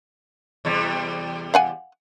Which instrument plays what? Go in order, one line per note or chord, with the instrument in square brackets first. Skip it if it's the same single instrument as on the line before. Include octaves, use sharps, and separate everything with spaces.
[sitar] E2 C3 G3
[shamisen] F5 F#5 G#5